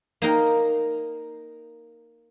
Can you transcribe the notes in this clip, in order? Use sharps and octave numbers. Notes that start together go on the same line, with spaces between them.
A#3 D#4 A#4